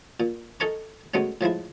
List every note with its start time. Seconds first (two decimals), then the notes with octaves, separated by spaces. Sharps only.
0.20 A#2
0.60 D#4 A4 A#4 G#5 A#5 C#6
1.14 D2 B2 G#3 B3 C#4
1.41 A2 F3 G#3 E4